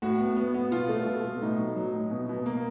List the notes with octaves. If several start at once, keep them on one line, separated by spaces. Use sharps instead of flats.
A2 F#4
B3
B3
B3
B2 F4
A3
B2
B2
A2 D#4
F#3
F#3
A2
B2
B2
A#3